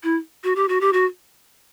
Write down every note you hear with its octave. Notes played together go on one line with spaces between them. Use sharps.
E4
F#4
G4
F#4
G4
F#4